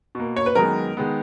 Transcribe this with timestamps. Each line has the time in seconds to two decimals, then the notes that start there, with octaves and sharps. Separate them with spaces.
0.15 B2 A#3
0.37 C#5
0.46 B4
0.55 F#2 D#3 G#3 B3 A#4
0.97 D#3 G#3 B3